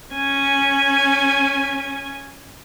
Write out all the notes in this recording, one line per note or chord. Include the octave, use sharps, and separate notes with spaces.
C#4 G#5